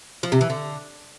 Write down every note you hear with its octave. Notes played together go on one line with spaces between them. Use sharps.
F3
C3
E3
D3